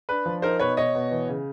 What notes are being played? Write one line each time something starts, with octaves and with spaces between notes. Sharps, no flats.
D4 B4
F3
D#4 A#4 C5
B2 B4 C#5
B2 C#5 D#5
B2
E3
C#3